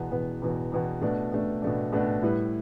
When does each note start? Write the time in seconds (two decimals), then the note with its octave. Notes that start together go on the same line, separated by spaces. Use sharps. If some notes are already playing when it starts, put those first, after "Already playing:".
Already playing: E2 B2 B3
0.11 E2 B2 B3
0.42 E2 B2 B3
0.72 E2 B2 B3
1.02 B2 A3 D4
1.32 B2 A3 D4
1.62 B2 A3 D4
1.93 B2 A3 D4
2.23 A2 G3 E4 B4